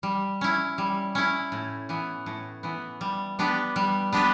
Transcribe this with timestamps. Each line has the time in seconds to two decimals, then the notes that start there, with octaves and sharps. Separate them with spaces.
0.03 G3
0.41 C#4 E4
0.78 G3
1.15 C#4 E4
1.52 A2
1.89 E3 B3
2.26 A2
2.63 E3 B3
3.01 G3
3.39 B3 D4 G4 B4
3.76 G3
4.12 B3 D4 G4 B4